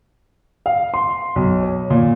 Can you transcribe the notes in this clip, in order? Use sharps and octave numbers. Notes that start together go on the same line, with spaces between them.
F5
C6
B1
C#5
A#2